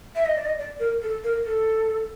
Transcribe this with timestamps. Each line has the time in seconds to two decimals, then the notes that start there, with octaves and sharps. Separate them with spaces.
0.16 E5
0.25 D#5
0.36 D5
0.45 D#5
0.58 D5
0.80 A#4
1.02 A4
1.24 A#4
1.45 A4